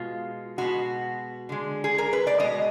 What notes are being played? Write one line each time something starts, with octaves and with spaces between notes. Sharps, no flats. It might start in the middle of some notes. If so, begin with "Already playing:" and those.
Already playing: B2 G#3 F4
B2 G#3 F#4
D3 G#3
G#4
A#4
B4
D5
B2 G#3 D#5